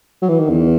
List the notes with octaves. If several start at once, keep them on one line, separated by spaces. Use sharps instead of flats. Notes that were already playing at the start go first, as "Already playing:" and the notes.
F#3
E3
D#3
E2